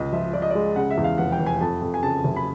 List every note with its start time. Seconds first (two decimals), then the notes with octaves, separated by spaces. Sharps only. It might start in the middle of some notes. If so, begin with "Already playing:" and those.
Already playing: C#2 C#3 D#5
0.12 F3 E5
0.33 F3 D5
0.42 D#5
0.51 G#3 D5
0.76 C#3 F#5
0.90 E5
0.98 E2
1.04 F5
1.18 F1 F#5
1.32 G5
1.39 F1
1.46 G#5
1.61 F2 A5
1.82 F2
1.94 G#5
2.03 C#3 A5
2.24 F#1
2.36 B5